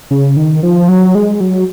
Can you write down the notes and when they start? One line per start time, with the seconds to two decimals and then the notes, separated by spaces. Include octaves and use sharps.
0.11 C#3
0.37 D#3
0.63 F3
0.88 F#3
1.15 G#3
1.40 F#3